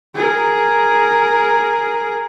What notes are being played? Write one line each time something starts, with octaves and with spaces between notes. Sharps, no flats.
G#4 A#4